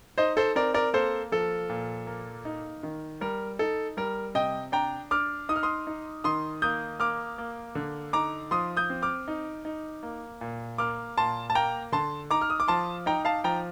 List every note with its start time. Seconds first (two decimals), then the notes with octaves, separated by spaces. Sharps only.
0.18 D#4 C5 D#5
0.37 A4 C5
0.55 C4 A#4 D5
0.74 A#4 D5
0.93 A#3 A4 C5
1.32 F3 A4
1.69 A#2
2.07 A#3
2.45 D#4
2.83 D#3
3.21 G3 A#4
3.59 D#4 A4
3.97 G3 A#4
4.35 C3 D#5 G5
4.72 D4 G5 A#5
5.11 D4 D6 F6
5.49 D#4 D#6
5.56 F6
5.63 C6 D#6
5.87 D#4
6.24 D#3 C6 D#6
6.62 A#3 D#6 G6
7.00 A#3 D6 F6
7.38 A#3
7.75 D3
8.13 D#4 A#5 D6
8.51 F3 C6 D#6
8.77 D#6 G6
8.90 C4
9.02 D6 F6
9.28 D#4
9.65 D#4
10.03 A#3
10.41 A#2
10.78 A#3 D6 F6
11.17 A#2 A5 C6
11.50 A5
11.55 A#3 G5 A#5
11.92 D3 A5 C6
12.30 D#4 A#5 D6
12.41 F6
12.50 D#6
12.60 D6
12.68 F3 A5 C6
13.06 D#4 G5 A#5
13.25 F5 A5
13.44 F3 G5 A#5